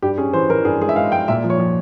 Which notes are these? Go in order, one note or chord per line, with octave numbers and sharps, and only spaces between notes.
G2 G4
C#4 G#4
E3 C5
E3 A#4
G2 G#4
G#3 G#4
E5
G#3 F5
G#3 G5
A#2 E5
F3
C#5
F3